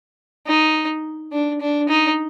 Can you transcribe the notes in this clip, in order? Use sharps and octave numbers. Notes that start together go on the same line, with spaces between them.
D#4
D4
D4
D#4